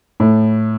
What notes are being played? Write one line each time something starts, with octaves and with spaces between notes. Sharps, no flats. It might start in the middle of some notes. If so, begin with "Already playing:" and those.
A2 A3